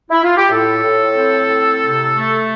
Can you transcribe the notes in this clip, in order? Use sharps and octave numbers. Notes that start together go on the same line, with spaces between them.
E4
F4
G4
A2 A4
A2
C4
A2
C3
A3